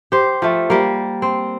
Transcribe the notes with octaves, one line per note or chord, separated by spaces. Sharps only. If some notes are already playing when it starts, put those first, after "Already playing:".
G4 C5
F3 A3
G3 A#3
C4